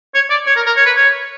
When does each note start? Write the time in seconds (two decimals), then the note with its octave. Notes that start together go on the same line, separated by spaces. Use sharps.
0.15 C#5
0.30 D5
0.46 C#5
0.56 A#4
0.66 A#4
0.76 C#5
0.86 B4
0.96 C#5